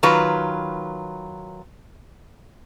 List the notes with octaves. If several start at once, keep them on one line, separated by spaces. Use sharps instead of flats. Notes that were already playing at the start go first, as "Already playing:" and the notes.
D#3 F#3 F4 B4